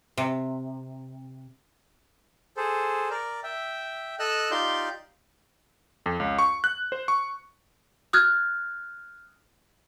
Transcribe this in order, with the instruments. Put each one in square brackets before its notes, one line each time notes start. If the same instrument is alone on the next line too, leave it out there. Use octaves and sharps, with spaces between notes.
[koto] C3
[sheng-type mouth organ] G#4 A4 C5
A#4 D5
E5 G5
A4 D#5 E6 F#6
D#4 F4 G4 D5 C6 G6
[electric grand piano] F2
C#2
C#6
F#6
C5
C#6
[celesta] D#6 F6 F#6 G#6 A6